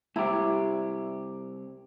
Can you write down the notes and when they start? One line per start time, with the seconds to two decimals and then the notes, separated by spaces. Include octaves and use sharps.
0.16 C2 E4 G4 A#5